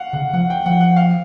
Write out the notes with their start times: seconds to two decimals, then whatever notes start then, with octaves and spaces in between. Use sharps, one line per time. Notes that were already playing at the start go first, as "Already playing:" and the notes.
Already playing: F5 F#5
0.13 C#3 F#5
0.33 F3 F#5
0.50 G5
0.66 F3 F#5
0.80 F#5
0.96 F5